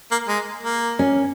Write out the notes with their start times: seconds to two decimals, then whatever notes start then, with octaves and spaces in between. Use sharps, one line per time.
0.11 A#3
0.28 G#3
0.63 A#3
0.99 C#4